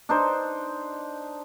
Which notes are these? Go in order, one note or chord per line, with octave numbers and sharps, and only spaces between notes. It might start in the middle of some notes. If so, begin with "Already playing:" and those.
D4 D#4 C5